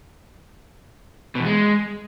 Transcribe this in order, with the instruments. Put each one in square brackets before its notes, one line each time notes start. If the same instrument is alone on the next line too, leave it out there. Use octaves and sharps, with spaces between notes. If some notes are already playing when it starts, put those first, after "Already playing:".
[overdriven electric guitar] B2
E2
G#3